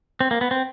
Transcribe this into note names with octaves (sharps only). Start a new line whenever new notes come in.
C4
A#3
B3
C4